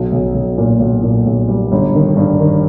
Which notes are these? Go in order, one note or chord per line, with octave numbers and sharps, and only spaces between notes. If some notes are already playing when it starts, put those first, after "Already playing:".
Already playing: B1
B1
B1
A#2
B1
A#2
B1
G3
G1
D#3
G2
D#3